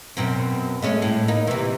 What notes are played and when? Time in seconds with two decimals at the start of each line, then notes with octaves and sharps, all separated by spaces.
0.17 F#2 B2 C4
0.82 G#3 A3 C#4
1.02 A2
1.28 A#3 D#4
1.47 C3 E3